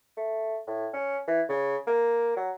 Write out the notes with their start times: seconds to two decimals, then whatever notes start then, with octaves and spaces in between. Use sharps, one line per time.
0.17 A3
0.67 A2
0.93 C#4
1.28 E3
1.49 C#3
1.87 A#3
2.36 F#3